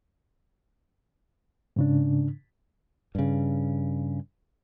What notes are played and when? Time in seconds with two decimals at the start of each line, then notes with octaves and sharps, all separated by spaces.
1.76 G#2 C#3 D4
3.15 G2 C#3